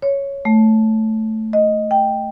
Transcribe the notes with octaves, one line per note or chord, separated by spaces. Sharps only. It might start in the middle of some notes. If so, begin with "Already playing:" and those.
C#5
A3
D#5
G5